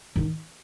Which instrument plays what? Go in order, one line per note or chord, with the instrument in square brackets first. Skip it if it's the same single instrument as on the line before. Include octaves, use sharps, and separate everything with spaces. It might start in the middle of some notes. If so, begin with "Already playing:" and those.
[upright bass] D#3